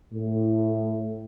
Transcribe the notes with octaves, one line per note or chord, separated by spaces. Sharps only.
A2